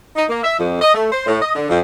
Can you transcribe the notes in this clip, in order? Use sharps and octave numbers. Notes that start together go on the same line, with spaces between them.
D#4
A#3
E5
F2
D#5
A3
C5
A2
D#5
D3
F2